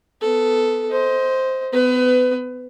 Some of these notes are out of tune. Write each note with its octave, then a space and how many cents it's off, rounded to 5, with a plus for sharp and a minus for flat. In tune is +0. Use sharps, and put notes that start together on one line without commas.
B3 +15 A4 +0
C5 +0 D#5 +25
B3 +30 B4 +25